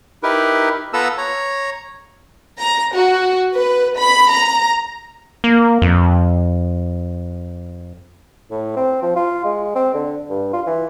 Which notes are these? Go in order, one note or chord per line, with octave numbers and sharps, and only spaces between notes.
D#4 E4 G4 A#4 B4
B3 F4 A4 B4 A#5 E6
C#5 A#5
A#5
F#4
B4
B5
A#5
A#3
F2
A2
C4
F3
F4
G#3
C4
D3
G2
F4
E3